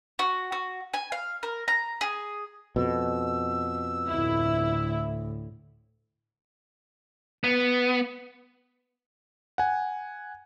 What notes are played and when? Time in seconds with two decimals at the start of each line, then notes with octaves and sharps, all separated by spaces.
0.19 F#4
0.52 F#4
0.94 G#5
1.12 F5
1.43 A#4
1.68 A#5
2.01 G#4
2.76 F2 B2 E6
4.09 D2 A2 E4
7.44 B3
9.58 F#5 G#5